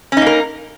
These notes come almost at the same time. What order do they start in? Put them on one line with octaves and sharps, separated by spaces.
C#4 D#4 A#3 A#4